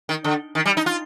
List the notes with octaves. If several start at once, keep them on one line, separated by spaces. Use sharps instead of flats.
D#3
D3
D#3
G3
D#4
F4